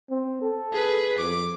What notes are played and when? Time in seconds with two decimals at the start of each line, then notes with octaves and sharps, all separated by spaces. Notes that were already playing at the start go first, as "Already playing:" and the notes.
0.10 C4
0.42 A4
0.73 G#4 B4
1.18 F2 D6